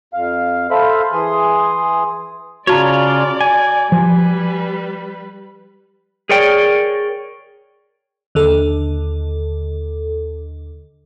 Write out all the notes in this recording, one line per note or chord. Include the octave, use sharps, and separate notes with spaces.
F2 F5
A4 C5 E5 F5 B5
E3 G#4 C6 D#6
C#3 F4 F#4 C#5 D5 A5 A#5
G#5
F3 G3 B4
G#4 A#4 C#5 D5 G5
D#2 D3 A4